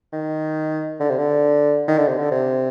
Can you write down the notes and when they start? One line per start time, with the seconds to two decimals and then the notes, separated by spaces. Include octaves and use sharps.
0.13 D#3
1.00 D3
1.10 C3
1.18 D3
1.88 D#3
1.98 D3
2.07 C3
2.17 D3
2.31 C3